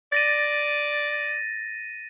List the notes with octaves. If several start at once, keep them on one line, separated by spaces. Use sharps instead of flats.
D5 A6 A#6 D#7